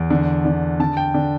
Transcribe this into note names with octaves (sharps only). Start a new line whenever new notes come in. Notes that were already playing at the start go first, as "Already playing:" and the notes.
Already playing: E2
D3
D3
D3 A5
G5
D3